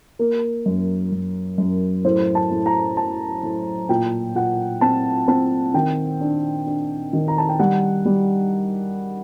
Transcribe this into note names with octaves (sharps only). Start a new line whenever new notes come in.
A#3 A#4
F#2
F#2
F#2
A2 C5
A5
A2
A#5
A2 A5
A2
A#2 G5
A#2 F#5
C4 A5
C4 A5
D#3 G5
D4
D4
D#3
A#5
A5
G5
G3 F#5
G3